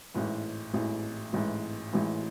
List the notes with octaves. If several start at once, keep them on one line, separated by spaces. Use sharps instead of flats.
A1 G#2 E3
A1 G#2 E3
A1 G#2 E3
A1 G#2 E3